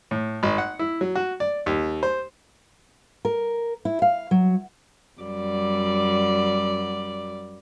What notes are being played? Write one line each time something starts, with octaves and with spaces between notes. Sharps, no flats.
A2
G#1
F#5
E4
F#3
F#4
D5
D#2
C5
A#4
E4
F5
F#3
F#2 G3 D5